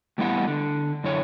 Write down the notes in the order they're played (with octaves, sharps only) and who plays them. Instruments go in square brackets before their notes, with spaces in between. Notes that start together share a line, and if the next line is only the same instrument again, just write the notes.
[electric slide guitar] A2 G3 B3 E4 E5 F#5
D3
F#2 D3 E4 C#5